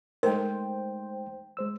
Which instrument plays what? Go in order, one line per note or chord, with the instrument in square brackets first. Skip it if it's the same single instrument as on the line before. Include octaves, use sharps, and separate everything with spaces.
[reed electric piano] G#3 A3 D#4 [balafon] A#4 [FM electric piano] C5 G5
[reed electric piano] G#3 C5 E6